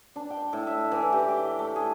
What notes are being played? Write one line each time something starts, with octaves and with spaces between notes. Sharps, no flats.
D4
G5
A2
E5
E3
G4
G5
A3
G#4